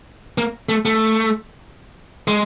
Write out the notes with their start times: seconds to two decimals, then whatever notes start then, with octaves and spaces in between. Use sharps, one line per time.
0.38 A#3
0.69 A3
0.85 A3
2.28 G#3